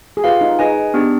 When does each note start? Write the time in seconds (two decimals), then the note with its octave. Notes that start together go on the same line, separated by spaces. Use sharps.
0.17 G#4
0.24 F4 G4 B4 F5
0.41 D#4
0.59 D#4 G#4 B4 D#5 G#5
0.94 B3 D4 G4